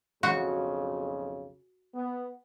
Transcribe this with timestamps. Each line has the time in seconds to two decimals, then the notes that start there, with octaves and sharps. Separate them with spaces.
0.23 B1 F2 C#3 F#4
1.94 B3